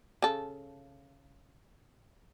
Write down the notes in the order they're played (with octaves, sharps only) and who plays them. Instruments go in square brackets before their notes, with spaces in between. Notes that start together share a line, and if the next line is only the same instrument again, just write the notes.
[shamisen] C#3 A4